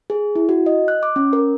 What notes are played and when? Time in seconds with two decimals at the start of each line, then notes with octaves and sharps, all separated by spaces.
0.10 G#4
0.36 E4
0.49 F#4
0.66 D#5
0.88 F#6
1.03 D6
1.16 C#4
1.33 A#4